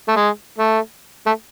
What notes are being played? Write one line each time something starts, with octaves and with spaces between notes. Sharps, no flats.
A3
G#3
A3
A3